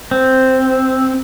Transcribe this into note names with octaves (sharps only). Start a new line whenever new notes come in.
C4